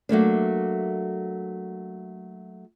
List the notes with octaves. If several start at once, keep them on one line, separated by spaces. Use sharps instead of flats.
F#3 A3 A#3 D4